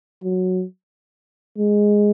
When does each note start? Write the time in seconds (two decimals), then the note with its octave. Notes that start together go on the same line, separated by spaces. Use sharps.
0.23 F#3
1.58 G#3